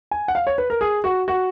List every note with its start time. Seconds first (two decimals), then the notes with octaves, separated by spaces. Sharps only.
0.11 G#5
0.28 F#5
0.35 F5
0.47 C#5
0.58 B4
0.70 A#4
0.81 G#4
1.04 F#4
1.28 F#4